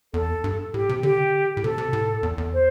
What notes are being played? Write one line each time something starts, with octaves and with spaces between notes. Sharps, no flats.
E2 A4
G2
A2 G4
C3
D3 G4
A2
C3 A4
C3
A2
E2
E2
C5